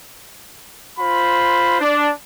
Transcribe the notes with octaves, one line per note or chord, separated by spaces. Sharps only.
F4 C5 B5
D4